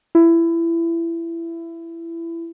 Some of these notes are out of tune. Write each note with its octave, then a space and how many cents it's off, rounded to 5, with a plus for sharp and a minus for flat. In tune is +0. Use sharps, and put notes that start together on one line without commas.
E4 +20